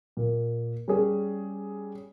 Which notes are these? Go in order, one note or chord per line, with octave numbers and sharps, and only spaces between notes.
A#2
G3 C#4 G#4